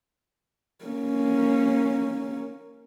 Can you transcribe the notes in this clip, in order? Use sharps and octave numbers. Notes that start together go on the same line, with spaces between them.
A#3 C#4